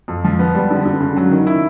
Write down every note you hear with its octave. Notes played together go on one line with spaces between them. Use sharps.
F2
F3
B3
G3
D3
D3
C#3
F#3
D#3
E4